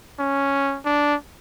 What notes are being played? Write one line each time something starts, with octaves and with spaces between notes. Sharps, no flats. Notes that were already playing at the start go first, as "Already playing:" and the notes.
C#4
D4